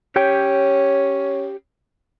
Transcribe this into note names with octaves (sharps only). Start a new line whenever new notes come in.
C#4 G4 C#5 G5